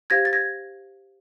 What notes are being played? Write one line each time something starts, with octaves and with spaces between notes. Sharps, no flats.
G4 C5 F5 G#6 A#6
A6
G#6 A#6